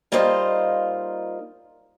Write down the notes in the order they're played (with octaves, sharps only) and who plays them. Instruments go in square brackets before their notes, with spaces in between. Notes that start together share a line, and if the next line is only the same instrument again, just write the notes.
[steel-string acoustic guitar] G3 A#3 D#4 F4 C5 D#5